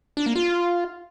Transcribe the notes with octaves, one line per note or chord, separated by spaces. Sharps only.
D4
A#3
F4